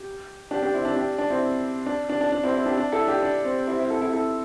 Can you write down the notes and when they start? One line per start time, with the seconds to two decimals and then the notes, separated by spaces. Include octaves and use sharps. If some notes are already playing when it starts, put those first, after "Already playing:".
Already playing: G4
0.51 D4 G4
0.62 D4 G4
0.73 C4 E4
0.85 D4
0.96 D4 G4
1.18 D4
1.30 C4 E4
1.86 D4
2.09 D4
2.21 D4
2.32 D4
2.43 C4 E4
2.55 C4 E4
2.66 D4 G4
2.77 D4
2.92 E4 A4
3.08 D4 G4
3.23 D4
3.45 C4
3.68 C4 E4
3.79 C4 E4
3.90 E4 A4
4.01 E4 A4
4.13 E4 A4